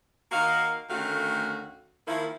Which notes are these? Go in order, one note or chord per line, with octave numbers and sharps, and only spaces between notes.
D#3 A#3 F#4 D#5 F5
D2 D#3 A3 C#4 F#4 F5
D#3 F3 A#3 E4